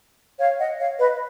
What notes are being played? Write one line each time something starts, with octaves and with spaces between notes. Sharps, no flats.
C#5 F5
D#5 F#5
C#5 F5
B4 D#5